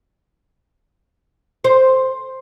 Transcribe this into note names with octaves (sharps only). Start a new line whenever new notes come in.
C5